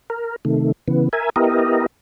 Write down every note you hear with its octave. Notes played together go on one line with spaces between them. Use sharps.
A#4
C3 D#3 A3
C#3 E3 B3
A#4 E5 G#5
B3 E4 G4 A#4 D#5